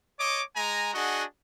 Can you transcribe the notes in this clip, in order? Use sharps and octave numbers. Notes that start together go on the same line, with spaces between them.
C#5 D#5 D6
G#3 G#5 A#5
D4 F#4 G#4 D#5 F#5